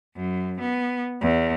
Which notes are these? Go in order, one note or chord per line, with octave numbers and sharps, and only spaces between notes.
F#2
B3
E2